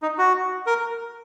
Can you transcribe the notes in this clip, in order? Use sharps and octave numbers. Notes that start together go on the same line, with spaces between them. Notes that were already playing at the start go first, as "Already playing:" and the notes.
D#4
F#4
A#4